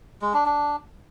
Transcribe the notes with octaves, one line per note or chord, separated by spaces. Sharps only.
G#3
D4
D4